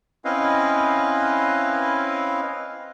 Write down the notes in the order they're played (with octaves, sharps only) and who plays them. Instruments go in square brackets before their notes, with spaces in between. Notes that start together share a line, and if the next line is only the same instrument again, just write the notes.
[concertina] C4 C#4 E4 B4 D#5 F5